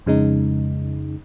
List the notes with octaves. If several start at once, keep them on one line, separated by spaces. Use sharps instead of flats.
F2 C#3 G#3 D#4